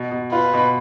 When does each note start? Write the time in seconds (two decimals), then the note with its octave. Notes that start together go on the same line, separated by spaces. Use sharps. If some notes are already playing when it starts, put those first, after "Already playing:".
Already playing: B2
0.12 B2
0.32 F4 B4
0.54 B2